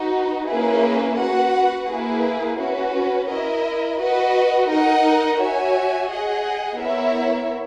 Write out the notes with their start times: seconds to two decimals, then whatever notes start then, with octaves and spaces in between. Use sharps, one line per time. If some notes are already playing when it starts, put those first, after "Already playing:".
Already playing: D#4 F#4 B4
0.49 A#3 C#4 E4 G#4 B4
1.20 F#4 B4 F#5
1.89 A#3 E4 G#4 B4
2.60 C#4 F#4 B4
3.30 E4 A#4 D#5
4.00 F#4 B4 D#5
4.70 D#4 A#4 D#5 F#5
5.40 F#4 C#5 E5 G#5
6.10 G#4 D#5 F#5
6.79 B3 E4 A#4 C#5 E5